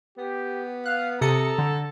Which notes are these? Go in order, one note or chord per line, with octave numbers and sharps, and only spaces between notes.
B3 G4
F5 F#6
C3 A4 A#5 D#6 C#7
D3